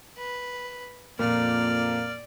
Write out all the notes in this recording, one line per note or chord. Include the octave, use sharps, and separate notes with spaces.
B4
F2 A#2 A#3 D5 F6